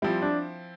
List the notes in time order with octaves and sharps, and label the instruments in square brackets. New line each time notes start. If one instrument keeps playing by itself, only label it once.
[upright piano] F3 C4 E4 [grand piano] G3
[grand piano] D4